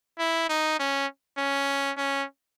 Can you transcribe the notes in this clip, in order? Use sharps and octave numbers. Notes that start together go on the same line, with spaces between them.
E4
D#4
C#4
C#4
C#4